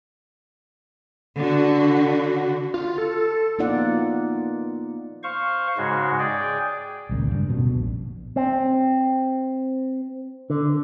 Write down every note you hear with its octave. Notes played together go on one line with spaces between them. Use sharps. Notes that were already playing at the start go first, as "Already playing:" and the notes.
D3 F#4
F4
A4
A#3 B3 D#4 F4 D5 F#5
C5 F5 C#6
G#2 C#3 G#3 F#4
G#4 D5 G5
D#1 C#2 A#2
G2
D1 F#2 B2 D3
A#1
C4
D3